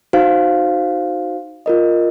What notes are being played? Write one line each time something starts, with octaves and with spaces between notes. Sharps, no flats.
D#4 F#4 C5 F5
F4 A#4 D#5